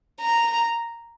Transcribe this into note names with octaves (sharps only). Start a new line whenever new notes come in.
A#5